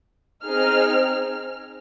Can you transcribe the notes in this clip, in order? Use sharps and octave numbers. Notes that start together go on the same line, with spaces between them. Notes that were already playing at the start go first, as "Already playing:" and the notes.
C4 D#4 G#4 F6